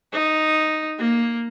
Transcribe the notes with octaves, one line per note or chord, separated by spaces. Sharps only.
D#4
A#3